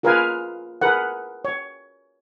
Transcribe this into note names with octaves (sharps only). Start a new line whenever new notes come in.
F4 G#4 A#4 B4 F5 G#5
G#4 A#4 B4 F#5
C#5